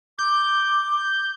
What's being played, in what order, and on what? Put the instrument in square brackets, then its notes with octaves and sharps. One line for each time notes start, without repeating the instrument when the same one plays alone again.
[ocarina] D6 [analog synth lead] G6